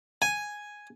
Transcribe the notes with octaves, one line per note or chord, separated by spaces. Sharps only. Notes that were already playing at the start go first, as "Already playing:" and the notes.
G#5